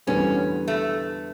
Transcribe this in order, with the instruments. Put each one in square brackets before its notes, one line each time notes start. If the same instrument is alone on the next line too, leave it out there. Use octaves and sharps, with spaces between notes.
[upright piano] E2 D3 G3 B3 [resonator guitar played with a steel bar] C#4
[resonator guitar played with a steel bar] A3